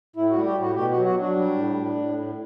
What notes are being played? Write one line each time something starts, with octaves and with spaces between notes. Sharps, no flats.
A2 E4
G3 F#4
G4
A2
F#4
B2 G4
F#3 F#4
F#4
F#3 D4
G3
A2
A2
A2
A2